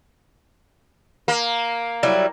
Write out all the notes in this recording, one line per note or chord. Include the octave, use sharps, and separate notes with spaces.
A#3
F#3 G3 E4